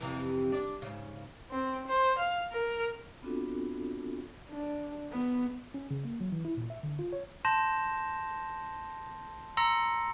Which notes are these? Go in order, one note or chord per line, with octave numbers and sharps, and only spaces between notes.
F2 C3 E3
D4 D5
G#2 C#3
C4
C5
F5
A#4
B3 C4 D4 F4 F#4 A4
D4
B3
C#4
C#3
A#3
F#3
E3
E4
A#2
E5
D3
F4
C#5
A5 C6 G6 A#6 E7
A#5 C6 E6 A#6 C#7